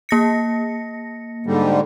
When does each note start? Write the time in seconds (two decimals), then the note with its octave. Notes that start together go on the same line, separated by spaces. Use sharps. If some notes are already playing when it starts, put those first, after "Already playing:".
0.09 A#3 A#6 C#7
1.46 G#2 D3 G3